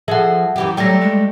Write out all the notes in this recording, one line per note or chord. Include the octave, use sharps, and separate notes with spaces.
F3 G#4 A4 E5 F#5
F#2 E3 G4
F#3 G3 A3 G5 A#6
G#3